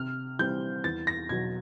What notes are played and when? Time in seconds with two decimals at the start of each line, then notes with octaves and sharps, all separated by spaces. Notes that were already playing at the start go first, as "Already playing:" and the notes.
Already playing: C3 F6
0.39 E3 G3 C4 G6
0.84 E2 A6
1.07 A#6
1.29 B2 F#3 G#6